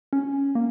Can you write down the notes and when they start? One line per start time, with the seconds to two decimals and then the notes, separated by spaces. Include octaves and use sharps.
0.13 C#4
0.55 A#3